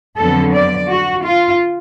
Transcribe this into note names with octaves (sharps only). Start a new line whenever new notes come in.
F2 D3 F#3 B3 A4
D5
F#4
F4